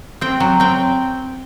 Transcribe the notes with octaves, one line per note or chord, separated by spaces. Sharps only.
C4 G5
F#3
C4 G5